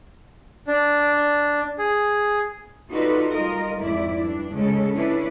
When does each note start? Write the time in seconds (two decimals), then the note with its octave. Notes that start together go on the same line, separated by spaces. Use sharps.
0.67 D4
1.78 G#4
2.90 D#4 F4 F#4 A4 B4 D5
3.29 G3 F4 A#4 D#5
3.79 F2 G#2 E4 D5
4.20 G2 D4
4.54 C#3 G#3 C#4 A4
4.95 C#4 D4 E4 B4